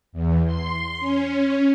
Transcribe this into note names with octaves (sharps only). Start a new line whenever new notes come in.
E2
C6
C#4